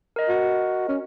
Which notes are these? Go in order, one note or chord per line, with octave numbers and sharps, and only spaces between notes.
A#4 D#5
F#4
C#4